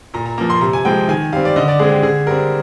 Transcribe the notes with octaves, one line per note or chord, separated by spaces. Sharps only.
A#2 A#5
A#5
F3 A#3 A#5
C6
C3 A#5
G#5
F3 G#3 C4 G5
D#3 G#5
G3 C4 F5
D5
D3 D#5
D5
G#3 C4 G#4
G4
D3 G#4
G3 C4 A#4